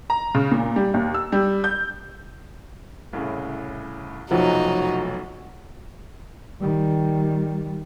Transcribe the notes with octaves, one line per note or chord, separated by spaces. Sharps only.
A#5
C#3
A#2
G3
D#2
E6
G3
G6
C2 A2 C#3
F1 B1 F3 F#3 D#4 F#4
D#3 G3